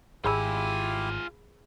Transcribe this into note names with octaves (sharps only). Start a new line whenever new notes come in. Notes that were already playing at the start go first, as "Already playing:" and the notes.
G#1 E4 F4 G4 G#4 G#5 B5 E6